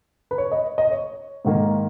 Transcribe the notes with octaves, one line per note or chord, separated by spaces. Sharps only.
B4
C#5
D#5
D#5
C#5
G#2 D#3 A#3